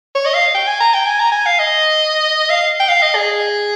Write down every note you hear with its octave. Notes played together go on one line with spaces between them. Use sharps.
C#5
D#5
F5
G5
G#5
A#5
G5
G#5
A#5
G#5
F5
D#5
F5
G5
F5
D#5
G#4